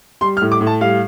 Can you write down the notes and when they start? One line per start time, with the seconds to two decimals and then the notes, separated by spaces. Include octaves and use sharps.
0.21 G3 C6
0.37 F6
0.41 A2
0.52 D6
0.61 A2
0.67 A5
0.81 G3 F5